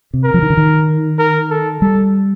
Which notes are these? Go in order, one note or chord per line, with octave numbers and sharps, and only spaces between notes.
C3
A#4
F3
D#3
D3
D#3
A#4
A4
G3 A4